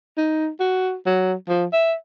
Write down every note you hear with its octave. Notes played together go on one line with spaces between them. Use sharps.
D#4
F#4
F#3
F3
E5